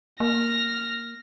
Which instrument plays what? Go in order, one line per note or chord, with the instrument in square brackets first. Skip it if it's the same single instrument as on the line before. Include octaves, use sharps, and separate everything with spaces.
[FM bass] A#3 [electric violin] F6 A#6